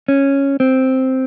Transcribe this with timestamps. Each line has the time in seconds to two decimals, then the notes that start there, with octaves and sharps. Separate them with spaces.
0.08 C#4
0.60 C4